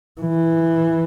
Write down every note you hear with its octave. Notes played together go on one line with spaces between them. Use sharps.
E3